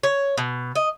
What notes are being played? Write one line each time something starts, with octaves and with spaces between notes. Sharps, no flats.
C#5
B2
D#5